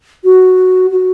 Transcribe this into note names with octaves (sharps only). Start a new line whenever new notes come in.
F#4
F#4